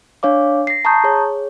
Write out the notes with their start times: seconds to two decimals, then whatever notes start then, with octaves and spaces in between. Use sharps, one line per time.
0.23 D4 C#5 F5 D6
0.67 A#6 C7
0.85 A5 A#5 C#6 D#6 G6
1.04 G#4 C#5